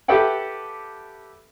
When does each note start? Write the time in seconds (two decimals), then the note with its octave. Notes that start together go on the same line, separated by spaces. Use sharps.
0.08 G4 A4 B4 E5 F#5 G5